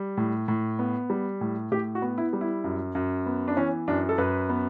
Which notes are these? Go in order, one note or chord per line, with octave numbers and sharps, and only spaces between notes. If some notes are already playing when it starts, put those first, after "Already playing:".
Already playing: G3
A2
A2
B3
G3
A2
A2 G4
F#4
B3
E4
G3
E4
F#2
F#2
B3
D4
E3 C#4
F#2 D4
A4
F#2 B4
B3